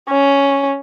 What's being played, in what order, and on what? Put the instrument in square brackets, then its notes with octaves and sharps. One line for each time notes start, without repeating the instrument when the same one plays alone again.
[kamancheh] C#4